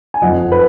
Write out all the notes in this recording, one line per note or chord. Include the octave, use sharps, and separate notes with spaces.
G#5
F#1 F2 F3 D#5 F#5
B4